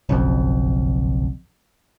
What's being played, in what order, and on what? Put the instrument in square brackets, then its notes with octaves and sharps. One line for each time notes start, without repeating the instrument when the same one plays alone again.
[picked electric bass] F#1 B1 F2